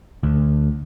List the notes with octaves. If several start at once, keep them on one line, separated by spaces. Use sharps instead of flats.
D2